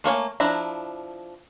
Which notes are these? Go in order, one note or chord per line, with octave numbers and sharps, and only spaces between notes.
A3 A#3 C#5 G#5
F3 D4 E4 A#5